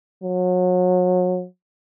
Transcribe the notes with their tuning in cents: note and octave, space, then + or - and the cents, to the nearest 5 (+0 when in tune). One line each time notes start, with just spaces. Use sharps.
F#3 -30